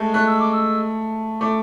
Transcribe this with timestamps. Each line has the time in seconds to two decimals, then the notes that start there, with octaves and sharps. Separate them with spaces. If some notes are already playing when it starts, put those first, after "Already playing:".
Already playing: G#3 A3
0.14 A3 F#6
0.27 E6
0.40 D6
0.53 E6
1.41 A3 D6